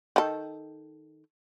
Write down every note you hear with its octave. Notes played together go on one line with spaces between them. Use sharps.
D#3 A4